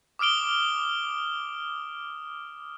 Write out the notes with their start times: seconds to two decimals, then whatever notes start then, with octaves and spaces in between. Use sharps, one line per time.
0.19 D6 D#6 F6 D7 G7